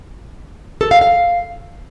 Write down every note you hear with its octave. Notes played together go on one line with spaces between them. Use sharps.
A4
F5
F5